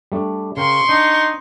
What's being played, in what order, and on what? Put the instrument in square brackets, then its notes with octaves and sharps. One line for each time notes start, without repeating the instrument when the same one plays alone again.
[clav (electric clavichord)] G3 A3 D4
[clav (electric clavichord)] C#3 A#4 G5 [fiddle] C6 C#6
[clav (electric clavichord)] D4 [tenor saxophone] D#4